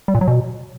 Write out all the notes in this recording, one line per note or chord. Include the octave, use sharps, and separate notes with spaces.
G3
A#2
F#3
B2